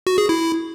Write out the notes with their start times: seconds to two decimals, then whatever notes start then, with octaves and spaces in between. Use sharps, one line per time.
0.07 F#4
0.18 G#4
0.29 E4